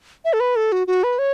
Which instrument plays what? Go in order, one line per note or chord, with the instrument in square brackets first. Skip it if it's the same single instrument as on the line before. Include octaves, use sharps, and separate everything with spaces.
[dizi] E5
A4
B4
A4
F#4
F#4
B4
C#5